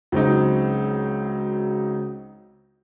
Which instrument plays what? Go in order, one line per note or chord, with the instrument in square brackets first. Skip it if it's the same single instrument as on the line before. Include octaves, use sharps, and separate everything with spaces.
[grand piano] C#2 [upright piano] F#3 C4 D#4